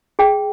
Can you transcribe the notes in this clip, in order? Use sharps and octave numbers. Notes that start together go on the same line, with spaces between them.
G#4 G5